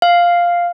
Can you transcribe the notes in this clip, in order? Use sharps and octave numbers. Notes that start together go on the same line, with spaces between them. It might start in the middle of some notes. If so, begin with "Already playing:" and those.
F5